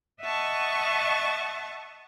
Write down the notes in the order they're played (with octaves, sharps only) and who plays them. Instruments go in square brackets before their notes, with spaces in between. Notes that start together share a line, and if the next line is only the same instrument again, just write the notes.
[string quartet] D#5 E5 F#5 A5 C#6 D#6